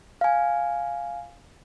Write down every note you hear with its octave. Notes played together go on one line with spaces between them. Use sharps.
F5 G#5